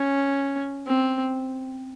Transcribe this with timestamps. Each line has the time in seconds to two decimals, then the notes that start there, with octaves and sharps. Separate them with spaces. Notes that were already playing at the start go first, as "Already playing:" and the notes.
Already playing: C#4
0.87 C4